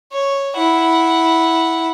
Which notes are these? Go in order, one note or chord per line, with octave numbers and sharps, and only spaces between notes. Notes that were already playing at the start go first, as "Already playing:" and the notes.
C#5
E4 F#5